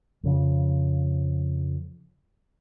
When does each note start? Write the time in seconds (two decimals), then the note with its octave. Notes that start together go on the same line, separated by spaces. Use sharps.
0.23 F2 C#3 F3